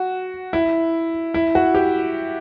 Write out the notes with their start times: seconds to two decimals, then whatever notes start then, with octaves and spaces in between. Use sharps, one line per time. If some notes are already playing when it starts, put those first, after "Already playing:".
Already playing: F#4
0.53 E4
1.34 E4
1.55 F#4
1.75 G4